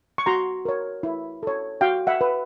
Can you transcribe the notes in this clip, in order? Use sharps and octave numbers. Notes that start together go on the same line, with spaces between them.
C#6
F#4 A#5 C6
A#4 C#5
E4
A4 C#5
F#4 F5 G5
E5 F#5
B4